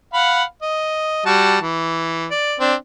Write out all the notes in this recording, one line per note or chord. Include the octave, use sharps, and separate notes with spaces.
F5 F#5 B5
D#5
G3 F#4 A5
E3
D5
C4 D4